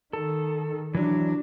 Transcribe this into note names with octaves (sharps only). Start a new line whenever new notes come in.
D#3 A4
E3 F#3 D4